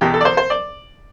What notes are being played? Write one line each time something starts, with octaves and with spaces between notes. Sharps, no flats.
E2 B2 G4
A4
D5
C5
C5
D5